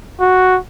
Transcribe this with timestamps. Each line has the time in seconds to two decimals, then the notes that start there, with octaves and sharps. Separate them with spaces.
0.20 F#4